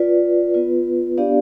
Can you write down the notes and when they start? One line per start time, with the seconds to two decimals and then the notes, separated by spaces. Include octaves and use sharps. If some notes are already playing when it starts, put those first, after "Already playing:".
Already playing: F4 B4 D5
0.54 B3 F4 B4
1.18 B3 D4 G4 D5 F5